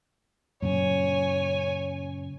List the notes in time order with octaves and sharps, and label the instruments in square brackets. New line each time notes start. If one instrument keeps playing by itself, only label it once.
[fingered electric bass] F#2 A#2 C#3 [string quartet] C#5 G#5